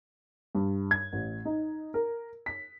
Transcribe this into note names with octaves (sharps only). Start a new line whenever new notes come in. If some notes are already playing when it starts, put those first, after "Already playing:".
G2
G#6
A1
D#4
A#4
B6